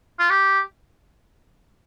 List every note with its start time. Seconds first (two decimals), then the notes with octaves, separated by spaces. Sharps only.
0.19 F4
0.30 G4